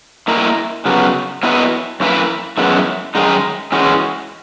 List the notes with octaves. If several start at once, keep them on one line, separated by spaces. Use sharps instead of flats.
A#3 E4 A#4 D#5
C#3 F#3 B3
F#3 B3 E4 B4 D#5
F#2 E3 A#3 E4 B4
F#2 E3 G#3 B3 E4
F#2 D#3 G#3 D#4 G#4
E3 G#3 C#4 F#4